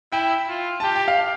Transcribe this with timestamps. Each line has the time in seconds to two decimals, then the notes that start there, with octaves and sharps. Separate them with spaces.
0.12 E4 G5
0.49 F4
0.80 A5
0.84 G4 G5
0.95 G5
1.08 F5